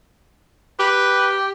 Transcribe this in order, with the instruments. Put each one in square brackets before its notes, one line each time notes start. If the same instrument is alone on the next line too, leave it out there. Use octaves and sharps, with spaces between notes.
[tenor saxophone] G4 [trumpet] B4